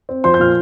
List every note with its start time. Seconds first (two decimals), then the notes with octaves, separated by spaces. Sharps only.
0.09 C4
0.24 F3 C5 C6
0.34 G6
0.40 A#2 F6